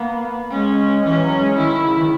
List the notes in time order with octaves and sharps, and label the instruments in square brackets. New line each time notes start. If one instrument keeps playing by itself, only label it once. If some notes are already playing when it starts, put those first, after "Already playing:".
Already playing: [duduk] A#3 [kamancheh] B3
[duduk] G#3 [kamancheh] C#4
[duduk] E3 [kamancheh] C#4
[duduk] F#3
G#3
[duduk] D#3 [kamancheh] E4
[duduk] C#3
D#3